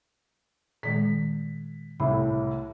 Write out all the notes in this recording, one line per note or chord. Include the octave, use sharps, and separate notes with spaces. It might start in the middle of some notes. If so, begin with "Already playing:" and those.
A#2 D#3 G#3 B6
C2 A2 B5